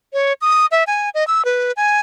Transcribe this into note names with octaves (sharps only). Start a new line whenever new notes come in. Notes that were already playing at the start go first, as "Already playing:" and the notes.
C#5
D#6
E5
G#5
D#5
E6
B4
G#5